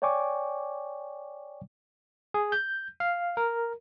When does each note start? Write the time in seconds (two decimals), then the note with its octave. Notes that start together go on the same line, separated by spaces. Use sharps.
0.02 C#5 D5 G5 G#5 C#6 D6
2.34 G#4
2.52 G6
3.00 F5
3.37 A#4